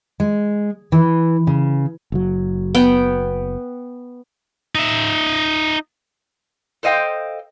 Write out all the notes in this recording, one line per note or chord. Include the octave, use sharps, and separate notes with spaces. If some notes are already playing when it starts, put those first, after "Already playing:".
G#3
E3
C#3
F#1 F#3
B3 G5
D#4 E5
A4 C5 D#5 F5 G5